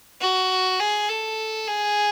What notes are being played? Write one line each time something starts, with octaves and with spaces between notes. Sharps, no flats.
F#4
G#4
A4
G#4